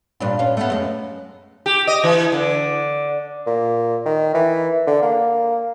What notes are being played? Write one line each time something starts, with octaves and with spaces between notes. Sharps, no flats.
G2 A#2 D4
C#4 F4
A3 B3
F#2 G#3
G4
D#5
E3
D3
A#2
D#3
E3
D3
A#3